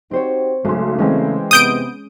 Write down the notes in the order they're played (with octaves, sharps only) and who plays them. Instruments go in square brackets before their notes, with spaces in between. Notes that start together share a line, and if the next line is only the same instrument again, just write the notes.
[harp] C4 C5 C#5 [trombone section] D#4 F#4 G4
[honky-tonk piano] B1 C6 [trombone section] C#3 A3 [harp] G#3 C#4
[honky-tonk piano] E3 G#3 C4 [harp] C#4
[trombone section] C3 B3 [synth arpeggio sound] D#6 G6 D7